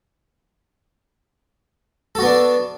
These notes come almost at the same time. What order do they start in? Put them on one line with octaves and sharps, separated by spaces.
A4 F#4 B3 D4